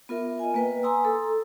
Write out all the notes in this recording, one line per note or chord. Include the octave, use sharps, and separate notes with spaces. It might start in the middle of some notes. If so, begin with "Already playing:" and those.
B3 F4 A#4 E5
D#5 G#5
A#3 B4 G5
G#5 A#5 C6 D#6 E6
A4